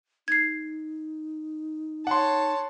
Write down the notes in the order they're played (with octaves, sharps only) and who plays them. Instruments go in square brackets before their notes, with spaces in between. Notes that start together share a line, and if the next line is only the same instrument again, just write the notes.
[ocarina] D#4 [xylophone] G#6 C7
[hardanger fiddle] C#5 A5 [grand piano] F#5 C6